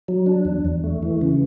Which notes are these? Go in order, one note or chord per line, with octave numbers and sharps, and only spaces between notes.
F#3
D4
E2
E2
A3
E3
C#3